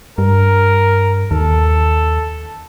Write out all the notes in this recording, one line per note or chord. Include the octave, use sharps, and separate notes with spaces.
G2 A#4
D#2 A4